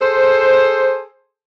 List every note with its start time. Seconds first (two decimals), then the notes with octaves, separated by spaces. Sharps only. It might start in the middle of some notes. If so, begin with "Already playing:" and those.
0.01 G#4 A4 C5